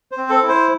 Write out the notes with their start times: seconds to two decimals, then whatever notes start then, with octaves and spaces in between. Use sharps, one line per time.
0.11 C5
0.17 C4
0.30 A4
0.43 E4
0.48 C5